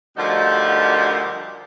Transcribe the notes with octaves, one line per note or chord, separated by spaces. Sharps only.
D2 F3 G3 D#4 F#4 A#4